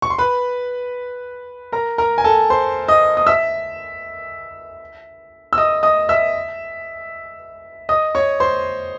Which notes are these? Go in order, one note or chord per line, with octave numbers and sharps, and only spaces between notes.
C#6
C6
B4 B5
A#4 A#5
A#4 A#5
G#5
A4 A5
C5 C6
D#5 D#6
D#6
E5 E6
E6
D#5 D#6
D#5 D#6
E5 E6
D#5 D#6
C#5 C#6
C5 C6